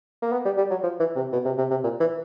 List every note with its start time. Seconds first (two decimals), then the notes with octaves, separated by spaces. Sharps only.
0.22 A#3
0.32 B3
0.45 G3
0.57 G3
0.70 F#3
0.83 F3
0.99 E3
1.16 C3
1.33 B2
1.45 C3
1.58 C3
1.70 C3
1.83 A#2
2.00 E3